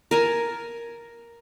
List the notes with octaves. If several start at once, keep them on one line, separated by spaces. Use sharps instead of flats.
A#4 G#5 A5